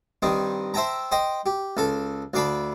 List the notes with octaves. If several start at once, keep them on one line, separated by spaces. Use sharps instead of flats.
G2 D#3 C4 D#4
C5 E5 G5 A5 A#5
C5 D#5 G5
G4
C#2 A4 A5
D2 D5 F5 A5 B5